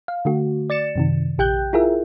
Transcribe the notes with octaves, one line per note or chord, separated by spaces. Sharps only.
F5
D3 A3 F#4
D5 A6 C#7 E7
F#2 C3 D#3
A#1 G4 G5 F#6 G6
E4 F4 G#4 A#4 E5